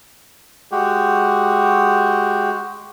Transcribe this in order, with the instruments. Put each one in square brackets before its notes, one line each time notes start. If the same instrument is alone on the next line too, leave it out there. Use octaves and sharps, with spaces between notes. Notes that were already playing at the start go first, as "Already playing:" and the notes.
[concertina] G#3 F#4 G4